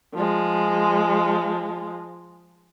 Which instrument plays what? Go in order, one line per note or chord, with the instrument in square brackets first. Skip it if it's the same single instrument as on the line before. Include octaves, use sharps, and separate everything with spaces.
[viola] F3 G#3